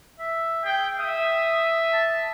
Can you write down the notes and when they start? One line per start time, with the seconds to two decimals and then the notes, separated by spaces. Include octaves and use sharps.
0.19 E5
0.65 G#4 G5
0.99 E5 D#6
1.93 A5